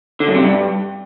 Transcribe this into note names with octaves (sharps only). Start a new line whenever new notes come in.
D3
F#2
C3
G2